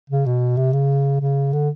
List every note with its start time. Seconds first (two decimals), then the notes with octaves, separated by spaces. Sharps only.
0.10 C#3
0.26 B2
0.57 C3
0.73 C#3
1.21 C#3
1.53 D3